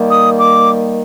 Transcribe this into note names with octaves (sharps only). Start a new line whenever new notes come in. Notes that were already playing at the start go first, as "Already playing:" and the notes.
Already playing: D#3 G3 A#3
D#6
D6